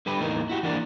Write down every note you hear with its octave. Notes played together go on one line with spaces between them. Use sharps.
D3 G3 G4 B4
E2 A2 A#3 D#4 A#4
E4 F#4 G4
E3 A#3 D4 A#4